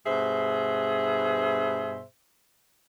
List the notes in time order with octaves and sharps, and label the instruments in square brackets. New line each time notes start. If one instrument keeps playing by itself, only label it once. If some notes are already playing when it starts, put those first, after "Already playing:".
[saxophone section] G2 B2 G#4 C5 E5